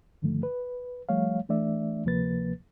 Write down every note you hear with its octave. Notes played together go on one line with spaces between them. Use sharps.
G2 D3 D#3 F3 A3
B4
F3 G3 A3 C#5 F5
E3 A3 D4 D5 E5
D2 C3 F3 A#3 B4 A6